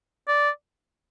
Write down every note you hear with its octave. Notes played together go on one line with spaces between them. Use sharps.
D5